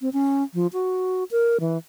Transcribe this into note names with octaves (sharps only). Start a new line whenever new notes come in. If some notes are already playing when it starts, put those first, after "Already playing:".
C4
C#4
F3
F#4
A#4
E3